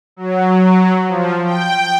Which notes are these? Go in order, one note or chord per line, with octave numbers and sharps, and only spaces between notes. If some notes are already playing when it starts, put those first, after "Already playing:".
F#3
F3
G5